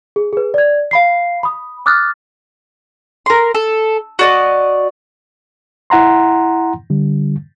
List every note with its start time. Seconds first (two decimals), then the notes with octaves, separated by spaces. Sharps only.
0.16 G#4
0.33 G#4 B4
0.54 D5 G#6
0.91 F5 B5 C7
1.43 B5 D#6
1.86 D6 D#6 F6 F#6 A6
3.26 A#4 C6
3.55 A4
4.19 F#4 D5 D#5
5.90 E4 F#5 A#5 C6
6.90 D3 G3